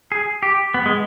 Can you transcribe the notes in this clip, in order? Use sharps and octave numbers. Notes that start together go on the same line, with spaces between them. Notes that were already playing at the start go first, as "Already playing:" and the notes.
G#4
G4
B3
G#3